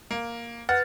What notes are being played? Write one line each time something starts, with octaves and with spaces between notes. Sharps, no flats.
A#3
B4 F#5 F6 A6